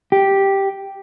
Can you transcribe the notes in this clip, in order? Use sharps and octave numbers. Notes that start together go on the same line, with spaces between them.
G4